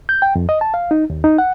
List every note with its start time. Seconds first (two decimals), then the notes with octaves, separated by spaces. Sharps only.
0.09 G6
0.22 G5
0.35 F2
0.49 D#5
0.61 A5
0.74 F5
0.91 D#4
1.10 D#2
1.24 D#4
1.38 F#5